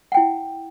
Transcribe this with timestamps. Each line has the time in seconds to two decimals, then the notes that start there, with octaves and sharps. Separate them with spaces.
0.12 F#5
0.14 G5
0.17 E4